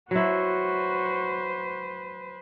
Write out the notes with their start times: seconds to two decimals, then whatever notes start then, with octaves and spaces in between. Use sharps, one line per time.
0.11 F#3 E4 F#4 B4 C5